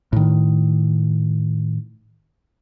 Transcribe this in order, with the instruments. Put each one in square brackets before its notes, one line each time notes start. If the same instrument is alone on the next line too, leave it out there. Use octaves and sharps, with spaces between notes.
[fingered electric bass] A2 D#3